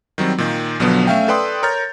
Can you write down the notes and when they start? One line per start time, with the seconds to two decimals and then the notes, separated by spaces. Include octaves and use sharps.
0.18 D#3 F#3 G3 C4
0.38 A#2 D#3
0.80 B1 B2 D3 F3 F#3 B3
1.07 A3 C#4 E5 F5 G5
1.28 A4 B4 D5 G5 C6 D#6
1.63 A#4 C#5 A#5 F6 G6 A6